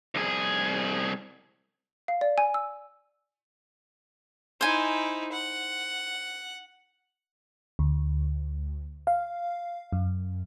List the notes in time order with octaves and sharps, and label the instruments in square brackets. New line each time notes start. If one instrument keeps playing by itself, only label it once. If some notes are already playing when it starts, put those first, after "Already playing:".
[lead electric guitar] C2 G#4
[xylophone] F5
D5
G#5
E6
[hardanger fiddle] D#4 E4 [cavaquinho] C5 G#5
[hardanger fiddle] F#5
[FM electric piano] D2
F5
F#2